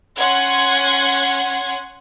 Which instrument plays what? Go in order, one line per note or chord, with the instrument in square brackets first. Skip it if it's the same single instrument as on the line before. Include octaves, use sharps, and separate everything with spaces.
[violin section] C#4 F#5 C6 G#6